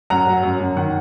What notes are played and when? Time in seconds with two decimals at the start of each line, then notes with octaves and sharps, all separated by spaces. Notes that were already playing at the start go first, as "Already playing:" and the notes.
0.10 F#2 F#5 A#5
0.27 F#3
0.43 F#2
0.60 F#2
0.77 D#3 F#5